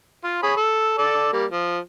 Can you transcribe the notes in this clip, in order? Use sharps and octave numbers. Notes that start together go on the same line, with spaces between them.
F4
G#4 C#5 B5
A4
A4 D5
G3 A#3
F3